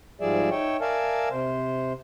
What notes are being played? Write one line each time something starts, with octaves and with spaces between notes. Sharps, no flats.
G#2 F3 G3 G#4 D5 E5
D#4 C#5 E5 G5
A#4 D5 E5 F5 G#5 A5
C3 C5